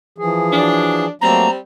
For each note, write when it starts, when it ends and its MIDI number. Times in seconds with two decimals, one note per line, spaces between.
0.18 1.07 52
0.18 1.07 53
0.18 1.07 68
0.52 1.11 54
0.52 1.11 62
1.21 1.48 54
1.21 1.58 55
1.21 1.48 57
1.21 1.48 58
1.21 1.58 60
1.21 1.50 82